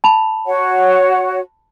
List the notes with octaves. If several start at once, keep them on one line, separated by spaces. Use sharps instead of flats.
A5 B5 F7
F#4 C#5 F#5